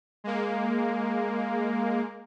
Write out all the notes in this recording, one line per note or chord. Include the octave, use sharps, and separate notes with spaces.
G#3 A#3